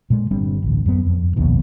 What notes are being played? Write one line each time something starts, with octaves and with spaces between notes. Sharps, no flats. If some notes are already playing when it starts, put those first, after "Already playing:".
A#2 G#3
G1 G3 C4 D4
A1 D2
F#2 B3
F2
A#1 D#2 B2